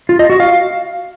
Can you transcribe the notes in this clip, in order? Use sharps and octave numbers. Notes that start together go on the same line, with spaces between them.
F4
D#5
F#4
F5